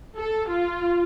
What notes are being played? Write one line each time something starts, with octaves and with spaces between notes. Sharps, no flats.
A4
F4